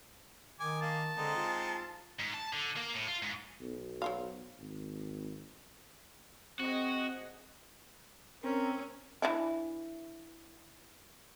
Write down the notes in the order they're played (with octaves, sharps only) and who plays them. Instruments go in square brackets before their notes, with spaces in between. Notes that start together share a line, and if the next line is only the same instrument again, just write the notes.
[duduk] D#3 [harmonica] G#5 D6
[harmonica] A#3 [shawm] A5
[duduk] D3 [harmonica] G#3 C4 D#4
[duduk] F4
[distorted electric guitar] G#2
A5
D3
A#3
A2
F4
G#2
[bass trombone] B1
[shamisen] F#3 C5 F5
[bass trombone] G#1
[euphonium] C4 [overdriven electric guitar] F#4 [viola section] G#4 D#5 F#5
[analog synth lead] C4 [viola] C#4 [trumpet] A#4
[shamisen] E3 D4 E4